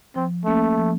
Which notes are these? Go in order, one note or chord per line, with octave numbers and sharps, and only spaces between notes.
F3 C4
A3 A#3 C#4
F3